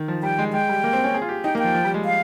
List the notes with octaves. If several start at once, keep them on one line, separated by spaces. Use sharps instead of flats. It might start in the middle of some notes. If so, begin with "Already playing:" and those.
Already playing: D#3
F3
G3 G5
G#3
G#3 G5
G3
A#3
C4
C#4
G#4
F4
G4
D#4 G5
A#3
G5
F3
F3
G3
G#3
F5